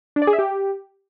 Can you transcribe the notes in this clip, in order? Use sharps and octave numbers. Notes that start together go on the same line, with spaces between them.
D4
D5
G#4
E5
G4